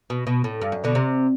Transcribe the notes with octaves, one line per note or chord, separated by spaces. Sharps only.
B2
B2
A2
G2
F#2
B2 D3
C3